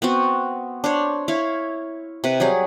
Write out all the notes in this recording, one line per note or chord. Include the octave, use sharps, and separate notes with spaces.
B3 C4 F#4
D4 C5 C#5
E4 C#5 F5
C3 B4
F#3 G3 G#4